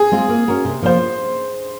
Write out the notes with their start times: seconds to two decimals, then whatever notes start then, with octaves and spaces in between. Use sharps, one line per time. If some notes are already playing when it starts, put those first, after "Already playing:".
Already playing: G#4
0.12 G#3 C4 F4
0.29 A#3
0.47 C#4 F#4 A#4
0.65 C3
0.82 F3 A#3 F4 C5